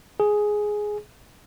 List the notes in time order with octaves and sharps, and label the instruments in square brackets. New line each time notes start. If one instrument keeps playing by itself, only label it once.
[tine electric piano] G#4